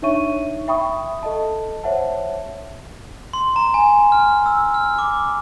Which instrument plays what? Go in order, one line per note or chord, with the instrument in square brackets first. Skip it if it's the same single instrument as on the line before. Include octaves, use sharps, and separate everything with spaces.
[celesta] D4 D#4 C#5 E5 C#6 D#7
E5 G5 B5 C#6 D#6
A4 D#5 A5
C5 C#5 E5 F#5 A5
[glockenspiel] C6
A#5
G#5
F6
E6
F6
D6